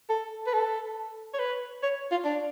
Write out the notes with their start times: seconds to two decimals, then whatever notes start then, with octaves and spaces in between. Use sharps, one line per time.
0.09 A4
0.47 B4
0.53 A4
1.34 C#5
1.39 B4
1.83 C#5
2.11 F4
2.25 D4